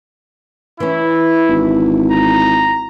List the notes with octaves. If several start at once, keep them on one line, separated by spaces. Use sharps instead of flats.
E3 C#4 E4
G#1
A#5